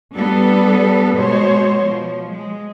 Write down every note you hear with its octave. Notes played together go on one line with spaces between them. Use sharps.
G3 B3 D4 A4 B4
B2 G#3 C5 C#5
F3
G#3